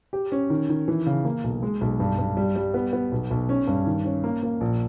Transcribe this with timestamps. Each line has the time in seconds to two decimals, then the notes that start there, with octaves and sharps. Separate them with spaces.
0.13 G4
0.32 C#4
0.50 D#3
0.69 D#3
0.88 E3
1.06 C#3
1.25 A#3
1.44 B1
1.62 G#3
1.81 B1
2.00 G2
2.18 G2
2.37 G3
2.56 G3
2.74 B3
2.93 B3
3.12 B1
3.31 B1
3.49 C#4
3.67 G2
3.87 D#3
4.05 C#4
4.24 A#3
4.43 A#3
4.61 A#1